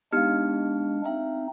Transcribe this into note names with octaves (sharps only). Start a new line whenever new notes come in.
G#3 B3 D4 D#4 G4 F5 F6
C4 D#4 E5